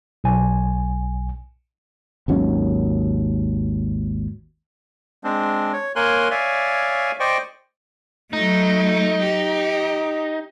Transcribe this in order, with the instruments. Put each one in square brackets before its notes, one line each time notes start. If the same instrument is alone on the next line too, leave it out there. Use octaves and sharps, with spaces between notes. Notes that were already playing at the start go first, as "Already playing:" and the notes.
[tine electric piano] B1 G#5
[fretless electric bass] G#1 D#2 F#3 C#4
[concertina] G#3 C4 D4
C#5
A#3 A#4 C#5 G#5 C6 F#6
C#5 D5 E5 F5 G#5
C5 D5 D#5 G5 C#6
[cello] F#3 A3 [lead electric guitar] D#4
[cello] G4